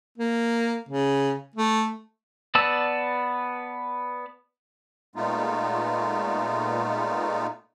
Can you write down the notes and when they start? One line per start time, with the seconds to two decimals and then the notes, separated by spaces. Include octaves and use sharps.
0.18 A#3
0.89 C#3
1.56 A3
2.55 B3 B4 D5 A5 E6
5.16 A#2 G#3 A3 B3 D#4 F4